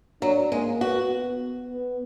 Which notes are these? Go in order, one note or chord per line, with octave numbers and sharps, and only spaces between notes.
F#3 D4
G#3 A#3
B3 F#4
B3